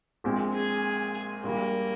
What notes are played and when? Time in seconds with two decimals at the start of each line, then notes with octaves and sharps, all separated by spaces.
0.24 A#1 A#2 G#3 C4
0.54 G#4
1.44 A#1 A#2 G3 A#3